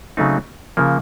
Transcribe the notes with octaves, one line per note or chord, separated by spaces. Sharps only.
C#3 F#3 A3 C4 D#4
C#3 F3 A#3